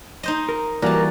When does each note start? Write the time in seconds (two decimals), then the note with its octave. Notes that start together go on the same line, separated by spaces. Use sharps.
0.23 D#4 C5 D#5
0.49 A#4
0.82 E3 G3 A#3 F#4 A#4 D5 A5